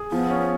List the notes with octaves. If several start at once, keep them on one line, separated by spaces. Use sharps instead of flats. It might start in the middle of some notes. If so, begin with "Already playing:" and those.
Already playing: G#4
F3 B3
C#4